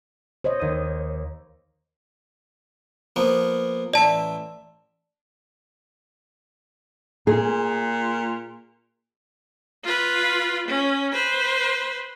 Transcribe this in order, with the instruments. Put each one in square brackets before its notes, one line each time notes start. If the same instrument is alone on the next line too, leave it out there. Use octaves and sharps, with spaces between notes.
[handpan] C5 C#5 D#5
[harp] D#2 D#6
[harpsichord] F3 A#3 B3
[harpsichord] A1 E5 [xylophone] D5 A5
[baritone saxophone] A#2 [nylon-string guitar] G#4
[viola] F4 B4
C#4
B4 C5